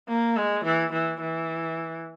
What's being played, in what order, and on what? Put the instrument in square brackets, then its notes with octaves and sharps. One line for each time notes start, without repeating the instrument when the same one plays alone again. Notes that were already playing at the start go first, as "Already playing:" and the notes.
[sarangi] A#3
G#3
E3
E3
E3